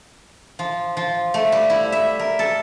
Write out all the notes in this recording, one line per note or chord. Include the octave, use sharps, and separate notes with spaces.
F3
F3
A3
G3
E4
E5
A#4
A4